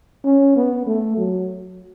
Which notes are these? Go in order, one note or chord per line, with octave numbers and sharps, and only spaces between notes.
C#4
B3
A3
F#3